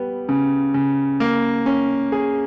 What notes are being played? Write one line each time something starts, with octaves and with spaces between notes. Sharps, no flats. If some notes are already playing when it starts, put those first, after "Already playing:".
Already playing: G3 B3
C#3
C#3
A#3
C#4
G#4